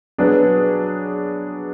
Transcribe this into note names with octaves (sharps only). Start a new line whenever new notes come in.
F#3 B3 D4 G#4